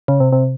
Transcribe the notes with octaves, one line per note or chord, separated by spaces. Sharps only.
C#3
C3
C3